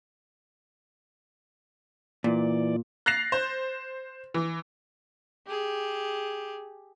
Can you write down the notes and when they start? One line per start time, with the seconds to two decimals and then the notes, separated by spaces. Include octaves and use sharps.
2.24 A#2 E3 D5
3.06 F#6 A6 A#6 C7 F7
3.32 C5
4.34 E3
5.47 G4 G#4